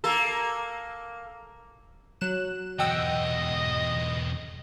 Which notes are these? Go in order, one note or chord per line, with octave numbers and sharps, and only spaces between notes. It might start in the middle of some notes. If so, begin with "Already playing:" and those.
A#3 A4
F#3 F#6 E7
B1 E2 D#5 F#5 G5 E6